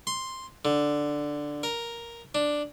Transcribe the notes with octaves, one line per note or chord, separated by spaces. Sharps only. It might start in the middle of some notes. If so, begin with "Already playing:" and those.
C6
D3
A#4
D4